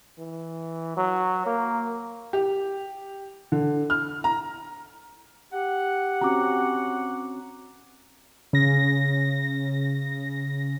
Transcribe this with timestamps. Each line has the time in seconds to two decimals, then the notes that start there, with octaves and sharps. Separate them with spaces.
0.18 E3
0.97 F#3
1.46 A#3
2.33 G4
3.52 D3
3.90 F6
4.24 A#5
5.53 G4 F#5
6.21 C4 C#4 F#4 A#5 D6
8.53 C#3 A#6